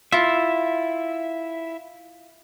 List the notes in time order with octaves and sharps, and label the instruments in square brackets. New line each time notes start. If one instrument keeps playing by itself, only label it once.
[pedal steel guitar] E4 E5 [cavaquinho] F4